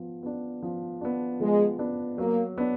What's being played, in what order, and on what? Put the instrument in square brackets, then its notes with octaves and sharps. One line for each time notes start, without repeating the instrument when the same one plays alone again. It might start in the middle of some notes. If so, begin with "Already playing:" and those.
Already playing: [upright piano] F3 B3
B3 D4
F3
B3 D4
[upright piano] F3 [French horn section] G#3
[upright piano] B3 D4
[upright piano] F#3 [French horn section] A#3
[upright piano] B3 D4